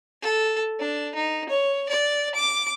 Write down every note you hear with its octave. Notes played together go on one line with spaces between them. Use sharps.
A4
D4
D#4
C#5
D5
D6